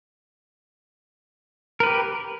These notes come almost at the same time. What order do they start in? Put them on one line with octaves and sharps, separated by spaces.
A#4 B4 G4